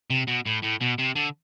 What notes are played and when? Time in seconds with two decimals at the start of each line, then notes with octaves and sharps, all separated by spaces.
0.10 C3
0.27 B2
0.46 A2
0.62 A2
0.81 B2
0.98 C3
1.15 D3